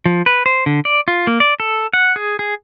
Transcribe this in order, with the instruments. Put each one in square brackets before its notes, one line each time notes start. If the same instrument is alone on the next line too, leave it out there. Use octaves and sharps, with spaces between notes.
[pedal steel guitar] F3
B4
C5
D3
D5
F4
A#3
D5
A4
F#5
G#4
G#4